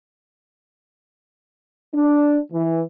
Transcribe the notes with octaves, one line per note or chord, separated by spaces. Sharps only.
D4
E3